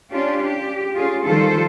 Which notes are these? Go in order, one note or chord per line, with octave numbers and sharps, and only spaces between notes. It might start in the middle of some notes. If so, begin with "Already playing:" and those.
C#4 D4 F4 G4
G4
C#4 F4 G#4
D#3 F3 G3 F4 A4 C5